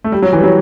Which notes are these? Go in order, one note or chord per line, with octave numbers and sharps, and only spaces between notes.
A3
G3
F#3
E3
G3
F#3